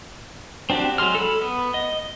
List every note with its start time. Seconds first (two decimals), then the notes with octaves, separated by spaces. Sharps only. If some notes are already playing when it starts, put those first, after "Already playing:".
0.70 C4 D4 F#4 G4
0.98 F#3 G#3 C6 F6
1.15 A4 B5
1.42 B3
1.74 D#5